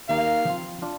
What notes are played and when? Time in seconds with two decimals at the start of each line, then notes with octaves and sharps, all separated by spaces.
0.09 D#2 D#3 A#3 D#4 G4 F5
0.45 F3 C4 F4
0.82 D4 F4